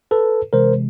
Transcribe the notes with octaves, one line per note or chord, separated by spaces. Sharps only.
A4 B4
C3 E3 G#3 A#4 C5